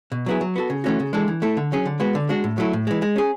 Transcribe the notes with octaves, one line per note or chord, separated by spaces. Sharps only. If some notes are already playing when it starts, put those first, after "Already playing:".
B2
F#3 B3 E4 G#4
F#3
B3 F#4 A4
C#3
E3 A3 C#4 F#4
C#3
E3 G#3 D4 A4
E3
A3 E4 A4
D3
F#3 C#4 G#4
D3
G#3 B3 F#4
D3
G#3 D4 F#4
A2
F#3 A3 E4
A2
E3 G#3
G#3
C#4 G#4